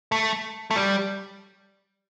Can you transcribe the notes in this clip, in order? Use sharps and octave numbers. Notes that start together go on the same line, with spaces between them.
A3
A3
G3